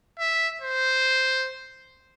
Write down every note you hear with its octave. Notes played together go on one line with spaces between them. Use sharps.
E5
C5